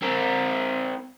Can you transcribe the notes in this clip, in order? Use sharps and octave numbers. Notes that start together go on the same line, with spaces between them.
C4 A#4